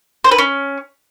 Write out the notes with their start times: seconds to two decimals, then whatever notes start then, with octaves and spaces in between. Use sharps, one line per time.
0.24 C5
0.31 B4
0.38 C#4